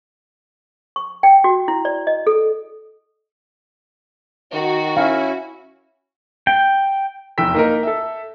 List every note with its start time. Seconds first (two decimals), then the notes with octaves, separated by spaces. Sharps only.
0.96 C#6
1.23 G5
1.44 F#4
1.68 E4
1.85 D5
2.07 D#5
2.27 A4
4.54 D#3 F#4
4.97 C#4 E4 F5
6.47 G5
7.38 F1 E2 G5 E6 B6
7.54 A#3 D#4 A#4
7.83 A4 E5